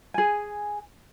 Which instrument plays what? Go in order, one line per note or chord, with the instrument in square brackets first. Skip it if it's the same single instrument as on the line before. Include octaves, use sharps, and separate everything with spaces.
[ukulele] G#4 G#5